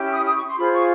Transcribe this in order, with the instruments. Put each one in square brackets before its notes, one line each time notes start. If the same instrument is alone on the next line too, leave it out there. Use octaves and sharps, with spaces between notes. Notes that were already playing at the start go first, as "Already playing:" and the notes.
Already playing: [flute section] C#4 E4 G4
D#6
D#6
C#6
C6
F4 G#4 C5 B5
C#6